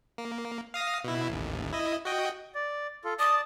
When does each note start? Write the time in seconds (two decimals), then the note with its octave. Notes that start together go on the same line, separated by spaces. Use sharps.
0.18 A#3
0.74 F5 D#6 A#6
1.04 B2 E4
1.29 A1 D#2
1.73 E4 D#5
2.05 F#4 D#5 G5
2.55 D5
3.05 F4 A4
3.19 D5 A5 D#6